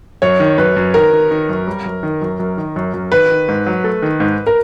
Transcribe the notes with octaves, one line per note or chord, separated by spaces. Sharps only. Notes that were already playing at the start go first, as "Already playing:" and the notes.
F#2 C#5
D#3
F#2 B4
F#2
D#3 A#4
D#3
D#3
F#2
G3
F#2
D#3
F#2
F#2
D#3
F#2
F#2
D#3 B4
D#3
G#2
F#3
A3
D#3
G#2
A#4